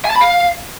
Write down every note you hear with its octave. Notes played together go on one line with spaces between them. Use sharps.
G#5
A5
B5
F5